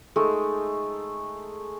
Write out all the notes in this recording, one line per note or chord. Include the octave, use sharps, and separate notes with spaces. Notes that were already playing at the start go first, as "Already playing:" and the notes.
G#3 A3 D#4